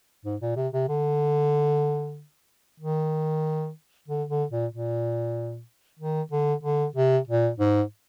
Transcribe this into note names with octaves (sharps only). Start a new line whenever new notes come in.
G#2
A#2
C3
C3
D3
D#3
D3
D3
A#2
A#2
D#3
D3
D3
C3
A#2
G#2